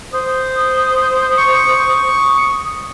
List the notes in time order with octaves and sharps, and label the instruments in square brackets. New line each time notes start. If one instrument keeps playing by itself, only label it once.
[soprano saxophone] C5 [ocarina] D#6
[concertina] C#6